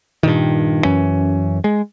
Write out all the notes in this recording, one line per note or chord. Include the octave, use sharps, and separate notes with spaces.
G2 A#2 D#3
F#2 E3 C#4
G#3